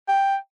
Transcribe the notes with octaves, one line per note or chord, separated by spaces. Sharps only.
G5